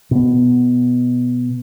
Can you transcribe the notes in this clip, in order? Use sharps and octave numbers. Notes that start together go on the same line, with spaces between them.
B2 B3